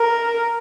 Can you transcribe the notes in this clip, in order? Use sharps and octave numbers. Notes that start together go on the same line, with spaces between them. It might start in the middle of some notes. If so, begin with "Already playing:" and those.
Already playing: A#4